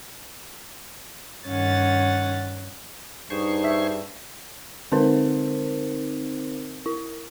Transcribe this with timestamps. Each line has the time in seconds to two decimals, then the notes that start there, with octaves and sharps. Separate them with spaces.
1.47 G2 D#3 C#4 F#5 A6
3.30 G2 D#4 G#4 C5 C#6
3.64 E5 B6
4.92 D3 C4 D#4 A#4 C5
6.86 E4